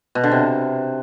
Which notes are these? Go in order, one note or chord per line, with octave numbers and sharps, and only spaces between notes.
B2
D3
C3